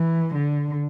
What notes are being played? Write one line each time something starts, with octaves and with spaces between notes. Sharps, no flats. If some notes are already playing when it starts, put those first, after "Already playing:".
Already playing: E3
D3